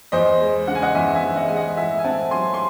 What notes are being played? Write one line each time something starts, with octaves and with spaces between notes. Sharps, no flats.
E2 C5 D#5
G#3
C#3 F#5
G#5
D#5 F#5
E2 E5 G#5
E5 G#5
E2
D#5 F#5
G#3 G#5
D#5 F#5
A2 E5 G#5
G#5
C4 F#5 A5
F#3 G#5 C6
C6